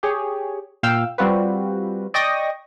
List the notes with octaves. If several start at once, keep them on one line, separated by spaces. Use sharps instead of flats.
G4 G#4 C#5
A#2 F5 G5 E6
G3 C4 F4 F#4 B4
D5 D#5 G5 C#6 D#6 A#6